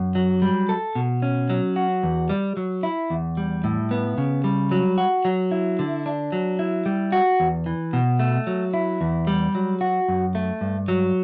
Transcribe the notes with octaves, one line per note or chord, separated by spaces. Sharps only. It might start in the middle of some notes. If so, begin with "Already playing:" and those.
Already playing: F#2
F#3
G3
A4
B2
C#4
F#3
F#4
E2
G3
F#3
E4
E2
G3
A2
B3
C#3
G3
F#3
F#4
F#3
E4
D3
D4
F#3
E4
G3
F#4
E2
E3
B2
A3
F#3
E4
E2
G3
F#3
F#4
F#2
A3
G2
F#3